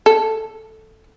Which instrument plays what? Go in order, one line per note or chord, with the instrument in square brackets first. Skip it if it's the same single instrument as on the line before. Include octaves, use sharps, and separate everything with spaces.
[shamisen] A4